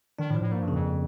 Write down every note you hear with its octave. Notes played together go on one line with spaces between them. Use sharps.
D#3 D4
A2
F3
A2
G#2 A#3
G2
C#3
F2